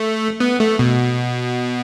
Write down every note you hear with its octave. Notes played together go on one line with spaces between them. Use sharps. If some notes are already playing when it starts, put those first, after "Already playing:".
Already playing: A3
B3
A3
B2